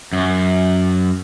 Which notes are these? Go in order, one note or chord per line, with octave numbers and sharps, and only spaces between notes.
F#2